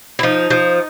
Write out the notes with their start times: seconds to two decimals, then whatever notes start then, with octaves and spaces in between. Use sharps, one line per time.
0.19 E4
0.23 F3 D#4
0.50 F3